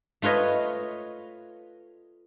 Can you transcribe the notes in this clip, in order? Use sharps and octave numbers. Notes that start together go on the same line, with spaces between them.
A3 F4 B4 C#5 D#5